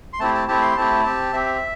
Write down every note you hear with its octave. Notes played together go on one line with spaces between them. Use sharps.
C6
A3 C4 E4 G4 A5
A5
A3 C4 E4 G4 A5
C6
A3 C4 E4 G4 A5
C4 G4
C4 G4 E5